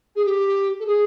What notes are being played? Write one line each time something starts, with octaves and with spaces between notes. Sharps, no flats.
G#4
G4
A4
G#4